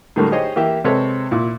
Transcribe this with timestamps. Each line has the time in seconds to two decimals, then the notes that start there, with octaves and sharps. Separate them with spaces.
0.16 A2 D3 F#3 G3 A3 A#3
0.32 D#4 G4 G#4 C5 C#5 D#5
0.56 E3 A#3 G4 E5
0.84 C3 G#3 C4 A4 B4 C#5
1.31 A#2 E4